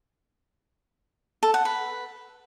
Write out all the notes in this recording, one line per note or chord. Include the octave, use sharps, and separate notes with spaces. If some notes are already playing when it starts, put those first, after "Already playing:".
A4
F#5
B4